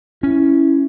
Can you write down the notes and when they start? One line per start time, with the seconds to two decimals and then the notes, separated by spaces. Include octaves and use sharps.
0.23 C#4 E4